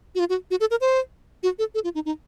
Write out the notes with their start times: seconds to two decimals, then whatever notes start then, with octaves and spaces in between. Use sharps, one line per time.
0.15 F#4
0.19 F4
0.29 F#4
0.51 F#4
0.60 A4
0.71 A#4
0.81 C5
1.43 F#4
1.59 A4
1.74 A4
1.84 F4
1.95 D#4
2.05 D#4